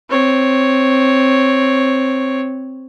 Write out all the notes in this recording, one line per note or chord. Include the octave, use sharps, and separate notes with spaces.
C4 C#5